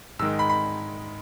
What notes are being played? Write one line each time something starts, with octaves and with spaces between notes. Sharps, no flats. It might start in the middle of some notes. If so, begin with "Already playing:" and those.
G#2 D#3 G#3 E6
B5
B5